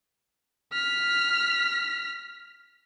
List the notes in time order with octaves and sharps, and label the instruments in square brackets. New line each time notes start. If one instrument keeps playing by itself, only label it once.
[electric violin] F6 B6